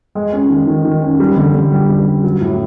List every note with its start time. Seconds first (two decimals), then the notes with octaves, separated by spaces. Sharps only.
0.15 G#3
0.32 C#4
0.49 D#3
0.67 D#3
0.85 D#3
1.02 C#4
1.19 G3
1.36 D3
1.54 D3
1.72 G3
1.89 G3
2.07 G3
2.23 F#3
2.41 A2